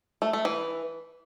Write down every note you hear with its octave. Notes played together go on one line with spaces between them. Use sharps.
A3
A3
E3